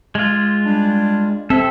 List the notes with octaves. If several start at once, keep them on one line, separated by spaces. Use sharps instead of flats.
G#3 F4
G3 D4
C4 A4 E5